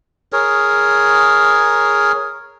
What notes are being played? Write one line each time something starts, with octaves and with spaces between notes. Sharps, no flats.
G#4 A#4 C#5